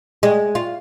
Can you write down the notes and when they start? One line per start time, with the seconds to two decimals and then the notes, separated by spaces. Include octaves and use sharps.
0.23 G#3
0.55 F4